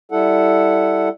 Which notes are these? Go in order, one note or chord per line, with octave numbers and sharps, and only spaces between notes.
G3 E4 A4 F#5